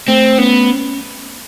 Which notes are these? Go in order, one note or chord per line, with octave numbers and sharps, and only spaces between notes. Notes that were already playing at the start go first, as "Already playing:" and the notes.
A3 C4
B3 C#4